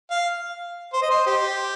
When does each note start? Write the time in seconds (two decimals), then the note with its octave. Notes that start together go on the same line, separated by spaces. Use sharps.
0.11 F5
0.93 C5
1.02 D#5
1.10 C5
1.26 G4